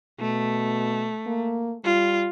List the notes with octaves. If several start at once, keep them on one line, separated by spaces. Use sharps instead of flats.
B2 A3
A#3
G3 F4